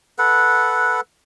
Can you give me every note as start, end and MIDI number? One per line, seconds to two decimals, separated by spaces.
0.19 1.00 69
0.19 1.00 71
0.19 1.00 78